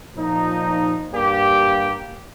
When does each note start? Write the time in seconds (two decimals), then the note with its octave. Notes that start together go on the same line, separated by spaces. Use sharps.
0.16 A#2 F3 D#4
1.12 G2 G3 A#3 G4